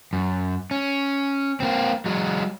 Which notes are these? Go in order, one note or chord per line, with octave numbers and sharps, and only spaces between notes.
F#2
C#4
A#3 C4
F#3 G#3